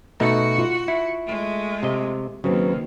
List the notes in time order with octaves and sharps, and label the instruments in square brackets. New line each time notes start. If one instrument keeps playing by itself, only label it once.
[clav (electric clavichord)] B2 A3 D#4 [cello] F#4 F#5
[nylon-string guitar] F4
[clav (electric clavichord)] E4
[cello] G#3 A3
[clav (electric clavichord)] C3 D#5
[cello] D#2 [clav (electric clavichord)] C#3 [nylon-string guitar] F#3 C4 B4